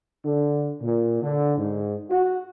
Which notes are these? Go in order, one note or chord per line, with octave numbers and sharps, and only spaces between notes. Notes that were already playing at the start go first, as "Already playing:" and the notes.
D3
A#2
D3
G#2
F#4